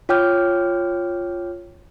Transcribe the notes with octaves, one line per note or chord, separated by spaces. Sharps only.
F4 C#5 G5 D6 F6 G6